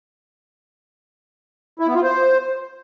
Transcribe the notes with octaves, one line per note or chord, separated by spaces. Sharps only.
E4
B3
F4
C5